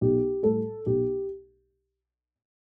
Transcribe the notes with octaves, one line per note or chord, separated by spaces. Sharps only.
B1 G4
A2 G3 A4
B1 G4